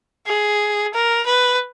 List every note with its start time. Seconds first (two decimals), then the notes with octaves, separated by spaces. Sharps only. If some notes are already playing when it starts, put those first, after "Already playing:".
0.26 G#4
0.94 A#4
1.26 B4